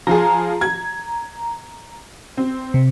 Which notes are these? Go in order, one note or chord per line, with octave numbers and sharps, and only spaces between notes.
F3 F4 G#4 A#5
G#6
C4
C3